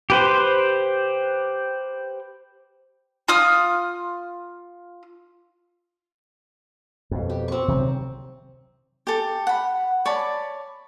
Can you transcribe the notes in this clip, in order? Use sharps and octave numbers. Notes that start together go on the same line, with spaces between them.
G4 B4 C5
F4 D#6 F6
F2 B2
G4
C4 C#6
C3 D#3 F#3
G4 A4
F#5 B5
C#5 D5 A5 B5